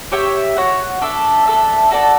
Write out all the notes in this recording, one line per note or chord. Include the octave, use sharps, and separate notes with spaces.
G4 C#5 E5 G5
F#4 C#5 F#5
D4 A4 E5
D4 A4 E5
F#4 A4 D5 A5